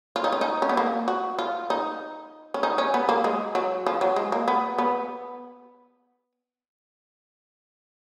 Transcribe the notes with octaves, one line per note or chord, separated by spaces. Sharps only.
F4
D#4
C#4
D#4
C#4
B3
A#3
F#4
F4
D#4
C#4
D#4
C#4
B3
A#3
G#3
F#3
F3
F#3
G#3
A#3
B3
B3